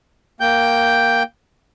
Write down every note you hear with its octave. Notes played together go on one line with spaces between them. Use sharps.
A#3 G5 G6